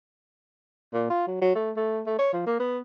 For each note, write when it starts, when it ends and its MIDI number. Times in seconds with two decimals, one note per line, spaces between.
0.94 1.07 46
1.10 1.27 65
1.27 1.38 54
1.41 1.54 54
1.55 1.71 57
1.76 2.01 57
2.06 2.16 57
2.19 2.30 73
2.33 2.46 53
2.46 2.59 58
2.59 2.79 59